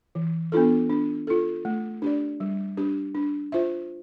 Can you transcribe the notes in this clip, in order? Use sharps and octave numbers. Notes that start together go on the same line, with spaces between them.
E3
B3 D4 F4 A4
D4
F4 A4
A3
D4 G4 D5
G3
D4 G4
D4
F4 C5 E5